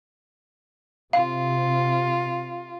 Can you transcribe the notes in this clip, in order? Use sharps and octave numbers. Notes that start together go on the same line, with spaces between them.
C3 F4 F5